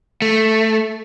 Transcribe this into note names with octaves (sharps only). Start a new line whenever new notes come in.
A3